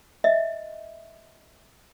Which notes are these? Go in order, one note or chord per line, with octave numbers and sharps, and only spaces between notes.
D#5 E5